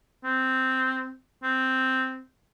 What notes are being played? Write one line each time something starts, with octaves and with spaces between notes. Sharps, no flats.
C4
C4